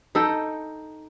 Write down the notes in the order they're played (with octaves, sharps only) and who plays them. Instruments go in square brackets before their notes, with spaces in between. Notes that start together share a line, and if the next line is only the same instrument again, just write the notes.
[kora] D#4 A4 D#5 G5